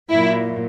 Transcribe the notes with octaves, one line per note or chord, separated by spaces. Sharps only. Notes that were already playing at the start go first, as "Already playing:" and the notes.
A#2 F#3 E4